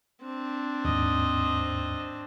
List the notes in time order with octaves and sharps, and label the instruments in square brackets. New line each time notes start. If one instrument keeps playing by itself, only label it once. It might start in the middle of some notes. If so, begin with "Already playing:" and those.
[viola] C4 D4
[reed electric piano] D#2 G#2 [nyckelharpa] D#5